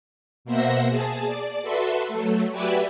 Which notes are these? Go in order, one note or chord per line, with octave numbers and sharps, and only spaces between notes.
B2 A#3 C5 E5 F#5 A#6
G#4 A5
D5
F#4 A4 B4 E5 C6
F#3 A3
F#4 G4 B4 D5 E5 G#5